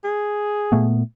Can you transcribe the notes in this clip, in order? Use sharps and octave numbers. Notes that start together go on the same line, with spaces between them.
G#4
A#2 A3 B3